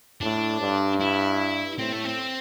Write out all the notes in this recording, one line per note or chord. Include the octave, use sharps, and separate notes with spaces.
A2 D4
G2
E4
A2 C4
A3
C4